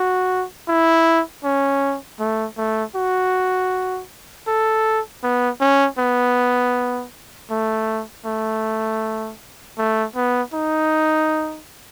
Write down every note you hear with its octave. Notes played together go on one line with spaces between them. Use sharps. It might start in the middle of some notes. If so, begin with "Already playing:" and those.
Already playing: F#4
E4
C#4
A3
A3
F#4
A4
B3
C#4
B3
A3
A3
A3
B3
D#4